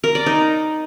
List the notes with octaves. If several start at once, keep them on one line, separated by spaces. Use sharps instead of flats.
A#4
D5
D#4